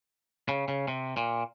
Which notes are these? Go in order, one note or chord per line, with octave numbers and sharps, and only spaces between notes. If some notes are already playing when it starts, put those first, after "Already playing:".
C#3
C#3
C3
A#2